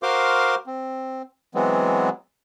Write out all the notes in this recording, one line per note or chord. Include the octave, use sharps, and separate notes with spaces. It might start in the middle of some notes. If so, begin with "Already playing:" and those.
F#4 A#4 C5 F5 C6 D6
C4
E3 F#3 G#3 B3 C4